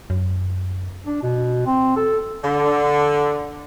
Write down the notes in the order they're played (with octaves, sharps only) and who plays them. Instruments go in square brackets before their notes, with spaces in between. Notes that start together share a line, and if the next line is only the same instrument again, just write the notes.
[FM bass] F#2
[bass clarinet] D4
B2
C4
A4
[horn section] D3